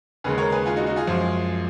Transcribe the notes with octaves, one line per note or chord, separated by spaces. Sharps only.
D#2 C#3 G#3 G#4 B4
A#4 C#5
G#4 B4
F4 G#4
D#4 F#4
D#4 F#4
F4 G#4
F#2 F3 G#3